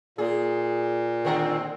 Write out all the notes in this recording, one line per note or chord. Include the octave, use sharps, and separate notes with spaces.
A#2 G#4
D3 D#3 C4